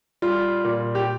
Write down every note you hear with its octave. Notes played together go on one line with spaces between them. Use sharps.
G3 F4
A#2
G4